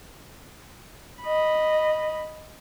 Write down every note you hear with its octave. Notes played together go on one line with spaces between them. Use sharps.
D#5 B5